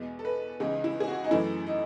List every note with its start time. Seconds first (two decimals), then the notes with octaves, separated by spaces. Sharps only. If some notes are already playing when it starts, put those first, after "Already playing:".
Already playing: E2 B2 G#3
0.19 A4
0.25 B4
0.60 C#2 C#3 E3 G#3 D#4
0.84 E4
1.00 G#4
1.08 F#4
1.24 D#4
1.31 F#2 E3 A3 E4
1.67 D#4